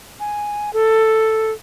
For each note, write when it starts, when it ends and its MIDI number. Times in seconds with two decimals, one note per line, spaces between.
0.20 0.73 80
0.73 1.51 69